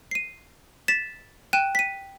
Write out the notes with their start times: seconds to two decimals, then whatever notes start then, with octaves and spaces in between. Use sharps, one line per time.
0.11 C7 D#7
0.88 A6 B6 E7
1.53 G5 F#6 D#7 E7
1.75 B6 D#7